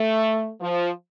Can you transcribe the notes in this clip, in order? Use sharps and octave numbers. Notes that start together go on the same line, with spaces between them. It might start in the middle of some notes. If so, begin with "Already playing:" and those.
Already playing: A3
F3